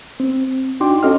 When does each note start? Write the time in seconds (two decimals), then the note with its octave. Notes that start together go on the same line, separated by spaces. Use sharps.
0.20 C4
0.80 D4 D#4 F#4 G5 C6 D6
1.03 C#4 F#4 A4 D#5 C6 F6